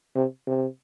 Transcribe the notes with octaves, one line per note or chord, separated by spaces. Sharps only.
C3
C3